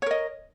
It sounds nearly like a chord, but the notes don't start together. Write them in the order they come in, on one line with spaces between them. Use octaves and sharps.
C#5 A#4 D#5